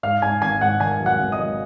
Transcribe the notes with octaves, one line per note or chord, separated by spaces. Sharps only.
G#2 F5 F6
G#2 G#5 G#6
G#1 G#5 G#6
G#2 F#5 F#6
D#3 G#5 G#6
F#3
F#5 F#6
G#1
D#5 D#6
F#3